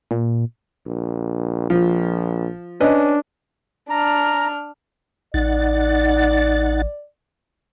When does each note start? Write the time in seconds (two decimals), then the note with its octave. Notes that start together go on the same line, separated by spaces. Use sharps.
0.11 A#2
0.87 A#1
1.70 A#1 F3
2.81 C#4 D4 B4 D#5
3.90 D4 A#5 F6
5.34 A1 D#4 D5 F#5 A6